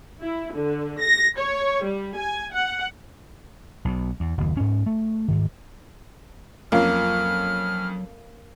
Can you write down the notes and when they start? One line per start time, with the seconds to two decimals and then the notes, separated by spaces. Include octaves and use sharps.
0.21 E4
0.54 D3
1.00 A#6
1.38 C#5
1.83 G3
2.16 G#5
2.53 F#5
3.85 B1 B2
4.20 E2
4.38 F#1 D#2
4.57 G#2 C#4
4.86 A3
5.28 D2 G#2 D#3
6.72 F2 F#3 A#3 C#4 F4 F6